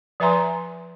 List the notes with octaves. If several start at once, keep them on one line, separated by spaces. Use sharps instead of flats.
F3 B4 E5 G#5 A#5 C6